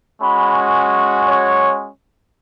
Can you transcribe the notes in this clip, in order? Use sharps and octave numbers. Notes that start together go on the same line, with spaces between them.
G#3 C#4 F#4 B5
C#5